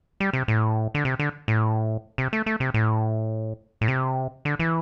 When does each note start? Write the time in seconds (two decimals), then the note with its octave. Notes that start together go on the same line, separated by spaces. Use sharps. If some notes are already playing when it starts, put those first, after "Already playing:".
0.20 G3
0.33 C3
0.48 A2
0.95 D3
1.05 C3
1.20 D3
1.48 A2
2.18 C3
2.33 A3
2.46 A3
2.60 C3
2.74 A2
3.81 A2
3.88 C3
4.45 D3
4.59 E3